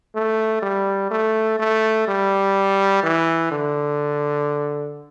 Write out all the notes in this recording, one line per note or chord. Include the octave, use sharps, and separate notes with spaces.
A3
G3
A3
A3
G3
E3
D3